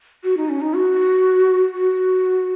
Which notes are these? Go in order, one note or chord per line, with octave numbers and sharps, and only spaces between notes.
F#4
D#4
C#4
D#4
F#4
F#4